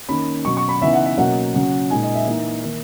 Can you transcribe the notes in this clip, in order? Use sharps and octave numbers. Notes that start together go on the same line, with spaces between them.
D#3 A#3 C#4 B5
B2 F#3 C#4 C#6
C#6
B5
C#3 E3 B3 D#4 E5
F#5
E5
B2 F#3 A#3 C#4 F#5
C#3 F#3 C#4
A#2 G#3 D#4 G#5
D#5
E5
E3 A#3 D#4 E5
D#3 A#3 D#4